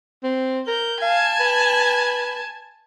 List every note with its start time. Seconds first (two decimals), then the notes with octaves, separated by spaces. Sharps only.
0.23 C4
0.67 A#4 G6
1.02 F5 G#5 A5
1.40 B4